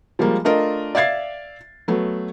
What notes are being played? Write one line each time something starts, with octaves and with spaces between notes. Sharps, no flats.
F3 G3 G#3 A#3
A3 D4 F4 A#4 D#5
D5 E5 F5 G#6 A6 C7
F#3 A3 B3